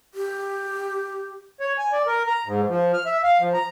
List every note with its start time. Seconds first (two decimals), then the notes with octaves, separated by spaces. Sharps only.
0.14 G4
1.60 C#5
1.78 G#5
1.92 D5
2.07 A#4
2.27 A#5
2.46 G#2
2.68 F3
2.94 F6
3.06 E5
3.23 F5
3.39 F3
3.53 A#5